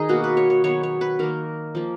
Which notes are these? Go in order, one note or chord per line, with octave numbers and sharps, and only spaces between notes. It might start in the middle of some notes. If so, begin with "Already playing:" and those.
Already playing: D#3 D#4 G#4
B2 A#3 F#4
B4
C#5
C#5
D#3 F#3 B3 C#5
C#5
B4
D#3 A#3 A#4
F3 A#3